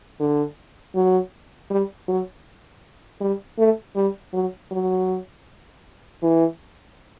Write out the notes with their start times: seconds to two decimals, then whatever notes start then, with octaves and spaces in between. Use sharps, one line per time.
0.20 D3
0.95 F#3
1.70 G3
2.08 F#3
3.21 G3
3.59 A3
3.96 G3
4.34 F#3
4.72 F#3
6.22 E3